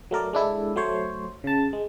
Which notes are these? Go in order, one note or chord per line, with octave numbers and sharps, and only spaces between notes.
F#3 A3 A#4 D5
G#3 D4 E4 A4
F#3 A3 C5 C#5
C#3 A5
G#3